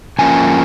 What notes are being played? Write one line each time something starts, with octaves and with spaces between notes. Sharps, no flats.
C#3 F3 A#3 C#4 G#5